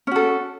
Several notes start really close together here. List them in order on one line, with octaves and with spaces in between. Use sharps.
C#4 F#4 A4